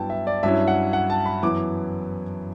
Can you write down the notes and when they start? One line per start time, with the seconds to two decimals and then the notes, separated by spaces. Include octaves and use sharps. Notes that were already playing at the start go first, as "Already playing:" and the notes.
Already playing: G2 F#3 B3 E4 G5 A5
0.10 E5
0.27 D5
0.43 G2 F#3 C#4 E4 E5
0.68 F#5
0.93 F#5
1.10 A5
1.26 B5
1.42 F#2 E3 B3 E4 D6